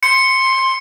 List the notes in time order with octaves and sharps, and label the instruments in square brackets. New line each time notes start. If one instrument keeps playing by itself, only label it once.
[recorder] C6 [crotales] C#7